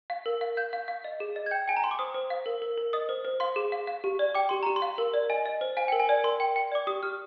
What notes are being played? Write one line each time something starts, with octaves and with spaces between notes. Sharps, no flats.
F5
A#4
F5
F5 G6
F5
F5
D#5
G#4
D#5
G#6
G5 G6
G5 G#5
A#5
G5 C6
D6
C5 D#6
C5
F5
A#4
A#4
A#4
D#5 D#6
C5
C5
F5 C6
G#4
F5
F5
G4
D5
G5 D6
G4 C6
G4 A#5
C6
F5
A#4
D5
D#5 G#5
D#5
C5
F5 G#5
A#4 G5
G#5
D5
A#4 C6
G5
G5
D5 D6
G4 D#6
G4 F6